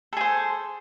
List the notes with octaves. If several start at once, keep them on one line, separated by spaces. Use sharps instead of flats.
G#4 A4 C5